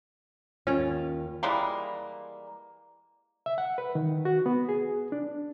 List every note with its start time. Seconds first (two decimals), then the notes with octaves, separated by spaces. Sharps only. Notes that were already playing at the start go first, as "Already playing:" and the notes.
0.67 D#2 C#4 F4
1.43 E3 G3 G#3 A#3
3.46 E5
3.58 F#5
3.78 B4
3.95 D#3
4.25 F#4
4.46 B3
4.69 G#4
5.12 D4